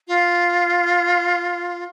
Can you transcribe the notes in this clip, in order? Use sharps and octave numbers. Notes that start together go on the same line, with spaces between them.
F4